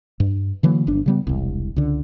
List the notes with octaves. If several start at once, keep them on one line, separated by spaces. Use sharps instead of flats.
G2
D3 E3 F#3 A#3
G1 D4
C#3 G3 B3
E1 C2
C#2 D3